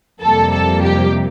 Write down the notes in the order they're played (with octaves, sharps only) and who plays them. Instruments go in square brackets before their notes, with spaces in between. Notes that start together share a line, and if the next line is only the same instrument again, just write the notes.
[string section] F2 C3 G3 A#3 A4
A4
G4